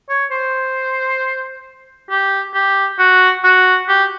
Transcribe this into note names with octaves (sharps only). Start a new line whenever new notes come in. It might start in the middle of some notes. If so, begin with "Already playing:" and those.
C#5
C5
G4
G4
F#4
F#4
G4